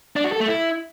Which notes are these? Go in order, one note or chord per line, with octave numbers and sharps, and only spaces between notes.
D4
F#4
A4
A3
E4